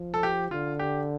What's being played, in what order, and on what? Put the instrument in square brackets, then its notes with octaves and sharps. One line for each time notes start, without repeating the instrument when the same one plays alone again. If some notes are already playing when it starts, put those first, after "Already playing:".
Already playing: [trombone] F3
[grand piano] A4
G4
[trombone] D3 [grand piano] F4
[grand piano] G4